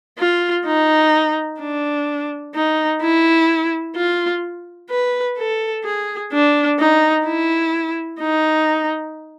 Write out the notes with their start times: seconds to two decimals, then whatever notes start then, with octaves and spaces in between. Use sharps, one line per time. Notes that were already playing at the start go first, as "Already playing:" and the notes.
0.18 F4
0.65 D#4
1.60 D4
2.55 D#4
3.02 E4
3.96 F4
4.90 B4
5.37 A4
5.84 G#4
6.32 D4
6.79 D#4
7.26 E4
8.21 D#4